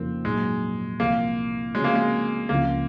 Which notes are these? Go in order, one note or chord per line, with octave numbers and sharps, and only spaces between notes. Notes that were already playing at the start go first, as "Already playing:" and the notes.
Already playing: F2 C#3 F3 A#3 C4 D#4
A#1 G#2 F#3 G#3
C2 A#2 F3 A#3
C#3 F3 G#3 C4 F#4 C#5
A#3
G#3
C#2 C#3 F3 A#3